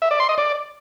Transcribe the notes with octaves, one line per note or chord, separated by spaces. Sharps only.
E5
D5
C6
D#5
D5